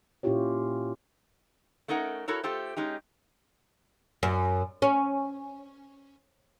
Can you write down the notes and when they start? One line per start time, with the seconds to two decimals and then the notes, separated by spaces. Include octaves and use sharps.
0.23 A#2 C#4 E4 F4 G4 C#5
1.88 A3 C#4 D#4 A#4 F#5
2.28 E4 F#4 A4 A#4 C#5
2.43 A3 F4 G4 A4 C5
2.77 G#3 C#4 D#4 G4
4.23 F#2
4.82 C#4